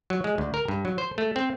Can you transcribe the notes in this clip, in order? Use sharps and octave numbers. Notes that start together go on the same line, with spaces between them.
F#3
G#3
D2
A#4
G2
F#3
C5
A3
C4